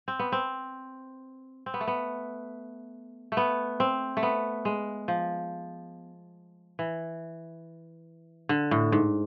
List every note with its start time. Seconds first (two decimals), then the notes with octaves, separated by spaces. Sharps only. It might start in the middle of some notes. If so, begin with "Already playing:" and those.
0.08 C4
0.19 B3
0.32 C4
1.66 C4
1.74 B3
1.81 A3
1.87 B3
3.32 A3
3.37 B3
3.80 C4
4.17 A3
4.23 B3
4.65 G#3
5.08 F3
6.79 E3
8.49 D3
8.71 A2
8.92 G#2